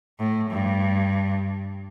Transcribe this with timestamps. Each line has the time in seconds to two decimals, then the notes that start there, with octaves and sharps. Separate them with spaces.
0.19 A2
0.50 G2